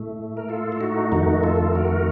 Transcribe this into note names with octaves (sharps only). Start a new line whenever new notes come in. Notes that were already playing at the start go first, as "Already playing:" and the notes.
Already playing: A2 A3
A#4
F4 A4
A4
D#4 F#4
F2 D#3 A3 D#4 F#4
F4 A4
F#4 A#4